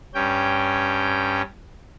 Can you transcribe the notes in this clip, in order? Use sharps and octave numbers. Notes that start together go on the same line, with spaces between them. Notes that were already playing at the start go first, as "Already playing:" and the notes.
G2 C#4 G5